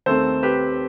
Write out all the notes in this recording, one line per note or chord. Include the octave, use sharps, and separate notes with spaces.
D#2 D#3 A3 C4 A4 C5
G4 B4